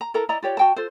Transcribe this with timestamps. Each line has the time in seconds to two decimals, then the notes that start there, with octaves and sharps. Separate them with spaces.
0.01 A#5
0.14 E4 A4 A#4 A#5
0.29 E4 D5 D#5 A#5
0.42 F4 G4 C#5 D5
0.57 F#4 G5 A5
0.76 F4 A4 C5